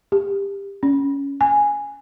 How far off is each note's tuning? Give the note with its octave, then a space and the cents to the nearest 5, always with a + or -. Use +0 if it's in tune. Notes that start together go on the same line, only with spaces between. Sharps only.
G4 +20
C#4 +10
G#5 -5